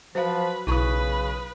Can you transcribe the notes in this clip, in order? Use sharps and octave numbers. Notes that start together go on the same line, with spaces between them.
F3 F#3 B4 C5 F5
B1 C#3 E4 B4 C#6 D#6